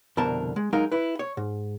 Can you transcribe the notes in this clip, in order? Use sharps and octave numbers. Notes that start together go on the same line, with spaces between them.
C2 F2 B2 D3 A#4 A5
G#3
F#3 G#3 D#4 A#4 F5
E4 B4
C#5
G#2